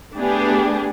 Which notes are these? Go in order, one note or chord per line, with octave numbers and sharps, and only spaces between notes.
A3 B3 D4 G4 G#4